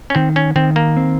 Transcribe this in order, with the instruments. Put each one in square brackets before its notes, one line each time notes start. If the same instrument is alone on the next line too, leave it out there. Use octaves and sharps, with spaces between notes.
[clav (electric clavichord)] C#4
[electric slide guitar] D#3 [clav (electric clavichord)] C4
[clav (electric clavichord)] C#4
[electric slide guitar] D#3 [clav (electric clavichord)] C4
[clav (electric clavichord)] A#3
[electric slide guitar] C4